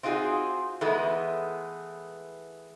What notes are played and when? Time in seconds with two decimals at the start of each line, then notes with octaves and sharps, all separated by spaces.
0.03 C4 D#4 F4 F#4 G#4
0.81 E3 G#3 A3 B3